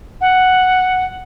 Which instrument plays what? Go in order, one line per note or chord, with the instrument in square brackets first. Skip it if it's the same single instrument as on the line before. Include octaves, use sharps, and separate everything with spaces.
[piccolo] F#5